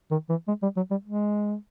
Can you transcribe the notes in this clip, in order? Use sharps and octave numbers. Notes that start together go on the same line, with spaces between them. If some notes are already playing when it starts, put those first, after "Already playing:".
D#3
E3
G#3
G3
F#3
G3
G#3